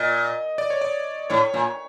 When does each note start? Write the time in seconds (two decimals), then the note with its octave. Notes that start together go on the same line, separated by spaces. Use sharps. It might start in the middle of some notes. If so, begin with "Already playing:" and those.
Already playing: A#2 D#5
0.58 D5
0.70 C#5
0.81 D5
1.30 A2 C#5
1.54 A#2